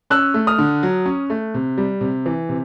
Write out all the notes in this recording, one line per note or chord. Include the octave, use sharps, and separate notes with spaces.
C#4 E6 F#6
A3
D#6 F6
D3
F#3
C#4
A3
C3
G3
C3
E3
C3